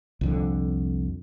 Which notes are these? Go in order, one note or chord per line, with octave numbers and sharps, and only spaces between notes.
C2 F2 D3